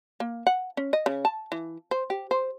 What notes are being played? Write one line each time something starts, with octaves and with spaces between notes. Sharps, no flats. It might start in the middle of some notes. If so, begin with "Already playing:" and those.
A#3
F#5
C#4
D#5
C#3
A5
E3
C5
G4
C5